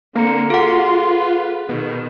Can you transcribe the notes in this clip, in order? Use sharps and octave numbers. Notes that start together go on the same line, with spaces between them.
D3 A#3 C4 F5 A#5 C#7
F4 F#4 G#4 A4 F#5 C6
B4
B2 D#3